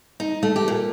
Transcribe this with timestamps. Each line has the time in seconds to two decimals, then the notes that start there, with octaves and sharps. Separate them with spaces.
0.20 D#4
0.43 A3
0.56 G4
0.68 A#2